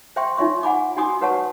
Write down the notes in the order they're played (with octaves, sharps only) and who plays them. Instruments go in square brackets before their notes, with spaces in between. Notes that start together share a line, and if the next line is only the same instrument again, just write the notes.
[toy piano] C5 E5 G5 C6 C#6
D#4 F4 C#5 E5 C6 C#6
F#5 G#5 B5 D6
D#4 F#4 G#5 C6 D6 D#6
F#4 B4 C#5 F#5 A5 C#6